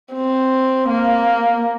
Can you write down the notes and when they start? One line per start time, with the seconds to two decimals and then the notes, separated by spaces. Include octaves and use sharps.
0.14 C4
0.89 A#3